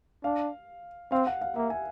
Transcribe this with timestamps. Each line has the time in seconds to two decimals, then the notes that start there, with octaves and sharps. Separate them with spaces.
0.24 D4 F5
1.11 C4 F5
1.27 F#5
1.41 F5
1.56 A#3 E5
1.70 G#5